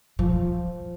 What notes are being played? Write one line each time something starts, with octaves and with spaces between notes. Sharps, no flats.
F3